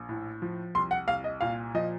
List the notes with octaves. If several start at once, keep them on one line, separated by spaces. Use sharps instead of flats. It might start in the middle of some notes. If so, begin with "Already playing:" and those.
Already playing: A#1
A2
F3
C2 C6
F#5
C2 F5
D#5
A#2 F5
F3 D#5